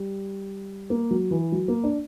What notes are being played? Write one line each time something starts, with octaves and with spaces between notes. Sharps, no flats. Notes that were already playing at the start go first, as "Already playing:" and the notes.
Already playing: G3
A#3
F#3
E3
F#3
A#3
D4